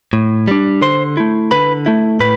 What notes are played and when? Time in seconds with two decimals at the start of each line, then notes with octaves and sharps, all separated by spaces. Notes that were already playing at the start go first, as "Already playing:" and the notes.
0.13 A2
0.48 G3 D4
0.82 D3 C5 C6
1.17 A3 E4
1.51 D3 B4 B5
1.86 A3 E4
2.20 A2 B4 B5